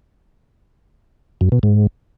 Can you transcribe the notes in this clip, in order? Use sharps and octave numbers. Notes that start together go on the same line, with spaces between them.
F#2
B2
G#2